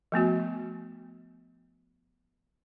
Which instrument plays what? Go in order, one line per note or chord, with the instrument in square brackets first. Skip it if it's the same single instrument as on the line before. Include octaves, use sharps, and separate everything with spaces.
[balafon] F3 A3 B3 F#4